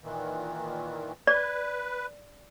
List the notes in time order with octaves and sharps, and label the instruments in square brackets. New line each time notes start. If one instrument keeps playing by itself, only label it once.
[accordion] A#2 D#3 E3
[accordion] B4 [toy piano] D5